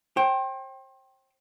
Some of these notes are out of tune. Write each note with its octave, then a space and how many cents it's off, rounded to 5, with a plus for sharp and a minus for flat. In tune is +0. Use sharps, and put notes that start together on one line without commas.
C5 +35 G5 -5